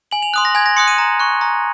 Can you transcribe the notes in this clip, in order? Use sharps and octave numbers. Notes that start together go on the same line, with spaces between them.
G#5 F#7
F7
C6 D#6 F#6
A#6
G#5 G#6
A#6
C6 D#6 F#6 C#7
D#7
A#5
C#6 F#6
A#5